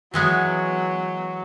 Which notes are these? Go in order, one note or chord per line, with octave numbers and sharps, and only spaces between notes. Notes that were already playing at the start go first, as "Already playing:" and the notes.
E3 F#3 G#3 B3